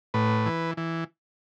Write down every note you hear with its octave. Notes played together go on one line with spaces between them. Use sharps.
A2 B4
E3
E3